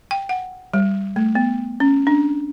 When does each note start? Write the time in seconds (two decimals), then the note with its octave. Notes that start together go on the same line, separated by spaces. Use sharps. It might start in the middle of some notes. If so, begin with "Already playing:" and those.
0.11 G5
0.29 F#5
0.74 G3
1.16 A3
1.35 B3
1.80 C#4
2.07 D4